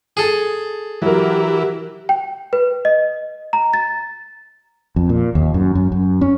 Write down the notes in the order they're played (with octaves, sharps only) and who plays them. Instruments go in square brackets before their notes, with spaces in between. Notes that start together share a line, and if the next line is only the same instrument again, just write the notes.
[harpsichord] G#4 A4
[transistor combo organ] E3 [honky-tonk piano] F#3 A#4 [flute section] G4
[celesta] G5
B4
D#5
A#5
A6
[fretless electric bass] F2
A#2
D#2
F#2
F#2
F#2
C#4